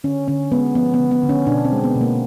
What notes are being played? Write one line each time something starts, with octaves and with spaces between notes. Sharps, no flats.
D3 C#4
D3 C#4
G#3 B3
F3 B3
B3
D3
B3
D3
C#4
B2 D4
C4
G#3
B3
B2
A#3